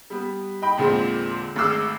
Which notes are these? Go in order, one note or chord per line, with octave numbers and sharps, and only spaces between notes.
G3 B3
D#4 G5 B5
E2 A#2 D3 G#3 C4
G#1 G#2 A3 D6 E6 C7